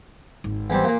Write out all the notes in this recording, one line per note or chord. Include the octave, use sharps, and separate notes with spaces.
G#1
E2 G3 C4
A#2 A#3